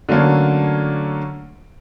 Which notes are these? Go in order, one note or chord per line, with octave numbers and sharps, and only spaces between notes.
D3 F#3 A3 A#3 C#4